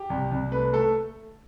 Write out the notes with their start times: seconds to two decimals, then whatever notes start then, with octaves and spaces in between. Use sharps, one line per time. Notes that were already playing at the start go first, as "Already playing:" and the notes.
Already playing: G4
0.10 C2
0.31 C2
0.52 A3 B4
0.73 A3 A4